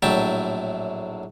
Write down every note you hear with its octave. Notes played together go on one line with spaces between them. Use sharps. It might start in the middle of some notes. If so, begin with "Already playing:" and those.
A#1 A2 F#3 E5 G5 A5